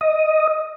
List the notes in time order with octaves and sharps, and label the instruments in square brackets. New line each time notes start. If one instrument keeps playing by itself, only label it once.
[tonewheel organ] D#5